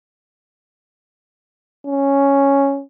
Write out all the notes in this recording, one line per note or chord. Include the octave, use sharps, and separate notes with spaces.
C#4